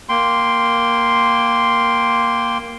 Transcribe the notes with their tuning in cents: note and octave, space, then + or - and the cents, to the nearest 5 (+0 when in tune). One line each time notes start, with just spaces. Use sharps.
A#3 +0 G5 +0 C6 -5